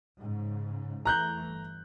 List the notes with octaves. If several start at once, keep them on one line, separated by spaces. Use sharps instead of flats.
G#2 C#3
E2 E3 A3 A#5 F#6 G6
G1